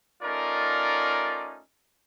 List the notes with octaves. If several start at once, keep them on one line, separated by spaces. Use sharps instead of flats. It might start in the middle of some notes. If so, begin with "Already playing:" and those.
A3 C#4 D#4 F4 A#4 D5